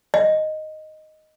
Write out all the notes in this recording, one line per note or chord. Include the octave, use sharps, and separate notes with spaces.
D#5